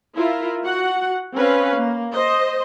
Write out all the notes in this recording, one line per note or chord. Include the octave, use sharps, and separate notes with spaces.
E4 F4 A#4
F#4 F#5
C4 C#4 B4 F5
A#3
C5 D#5